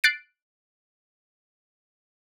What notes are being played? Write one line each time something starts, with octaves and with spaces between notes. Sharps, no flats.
F#6 A6 C7 D7